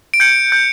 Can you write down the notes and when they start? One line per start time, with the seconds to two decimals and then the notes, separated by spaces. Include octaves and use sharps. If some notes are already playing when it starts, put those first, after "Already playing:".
0.14 D7
0.20 G6 C#7
0.52 G6